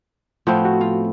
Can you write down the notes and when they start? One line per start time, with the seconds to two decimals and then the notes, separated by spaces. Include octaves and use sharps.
0.47 A2 F3 B3 C4
0.65 F#4
0.81 F4